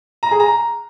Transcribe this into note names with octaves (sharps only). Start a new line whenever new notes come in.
A#5
G#4
A#5